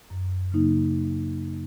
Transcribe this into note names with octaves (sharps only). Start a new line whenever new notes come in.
F#2
C#3 F#3 A#3 D#4